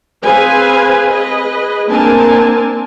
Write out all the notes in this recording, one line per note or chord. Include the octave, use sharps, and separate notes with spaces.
C4 G#4 B4 C5 F5 G#5
G#4 B4 D#5
A#3 C4 D4 A#4 G#5 A5